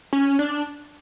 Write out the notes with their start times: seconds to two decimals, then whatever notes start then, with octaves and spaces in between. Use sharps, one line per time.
0.13 C#4
0.39 D4